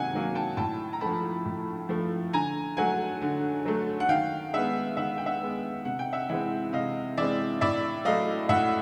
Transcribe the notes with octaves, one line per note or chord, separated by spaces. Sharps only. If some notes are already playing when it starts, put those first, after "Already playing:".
Already playing: C3 D#3 F#3 A#3 F#5 G#5
D#3 F#3 A#3
G5 A5
A2 G5 A5
A#5
F3 A3 A5 B5
A2
F3 A3
D3 G#5 A#5
F#3 A3 F#5 G#5
D3
F#3 A3
F#5
D#3 F5 G5
G#3 B3 E5 F#5
D#3 E5 F#5
G5
E5 F#5
G#3 B3
C3 F#5
G5
E5 F#5
E3 G#3 C4 E5 F#5
C3 D#5 F5
E3 G#3 C4 D5 E5
A2 D5 E5
F#3 A3 D#5 F5
A2 E5 F#5